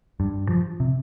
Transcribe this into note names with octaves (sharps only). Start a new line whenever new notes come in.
G2
F3
C3